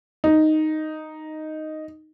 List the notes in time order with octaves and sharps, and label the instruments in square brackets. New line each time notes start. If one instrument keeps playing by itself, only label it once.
[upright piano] D#4